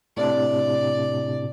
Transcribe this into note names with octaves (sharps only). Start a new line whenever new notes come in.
A2 C3 D4 D5